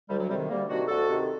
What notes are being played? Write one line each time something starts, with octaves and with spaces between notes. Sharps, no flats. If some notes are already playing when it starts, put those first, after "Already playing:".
D2 G3
F#3
C3 D#3 G3
D2 G3 A#3
C3 D#3 D4 F#4
D2 F#4 A4
C3 D#3